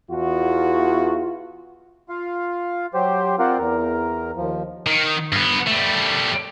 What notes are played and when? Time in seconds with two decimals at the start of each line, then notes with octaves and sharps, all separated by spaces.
0.10 E2 F4 F#4
2.09 F4 F5
2.94 F#3 G4 C5
3.39 C4 F4 A#4 C5 D5 F#5
3.58 E2 A#4
4.36 D#2 F3
4.86 D#3
5.32 G2 B3
5.67 G3 A3